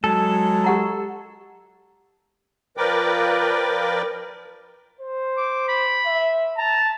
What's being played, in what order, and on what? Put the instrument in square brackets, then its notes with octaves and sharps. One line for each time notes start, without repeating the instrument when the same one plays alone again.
[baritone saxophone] F#3 [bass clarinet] G#3 [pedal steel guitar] A4
[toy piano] G4 F#5 A#5
[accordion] F3 A#4 B4 D5 G5 D6
[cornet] C5
[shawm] D6
B5
[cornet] E5
[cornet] A5 [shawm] A#5